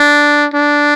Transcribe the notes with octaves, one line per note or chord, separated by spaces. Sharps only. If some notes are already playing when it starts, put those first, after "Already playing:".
Already playing: D4
D4